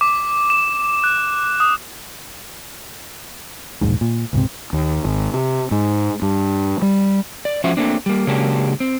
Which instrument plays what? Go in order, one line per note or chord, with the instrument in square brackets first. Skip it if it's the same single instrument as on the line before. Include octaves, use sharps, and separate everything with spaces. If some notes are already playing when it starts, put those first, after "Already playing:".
[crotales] D6
E7
F#6
D#6
[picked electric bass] E1 A#1 G#2
A#2
C#2 G#2 C3
[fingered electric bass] D#2
G#1
C3
G#2
G2
G3
[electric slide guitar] D5
F3 C#4 F4 F#4 C5 E5
A3 A#3 C4 D4
G3 A#3
C#3 F#3 G#3 A#3 D4 G4
C4